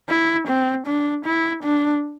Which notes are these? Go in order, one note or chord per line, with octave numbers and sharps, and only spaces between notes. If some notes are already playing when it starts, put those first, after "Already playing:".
E4
C4
D4
E4
D4